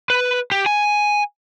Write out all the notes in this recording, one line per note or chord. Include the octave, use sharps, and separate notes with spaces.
B4
G4
G#5